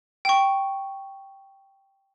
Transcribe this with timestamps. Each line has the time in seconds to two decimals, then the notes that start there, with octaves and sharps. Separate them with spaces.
0.25 G5 C#6